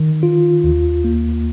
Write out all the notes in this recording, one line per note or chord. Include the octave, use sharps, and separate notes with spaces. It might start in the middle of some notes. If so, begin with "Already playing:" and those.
Already playing: D#3
F4
D#2
A#3